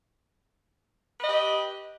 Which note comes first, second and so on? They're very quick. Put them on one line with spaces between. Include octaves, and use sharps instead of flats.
B4 D#5 G4